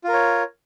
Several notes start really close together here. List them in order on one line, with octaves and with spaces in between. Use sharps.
F4 A#4 C#5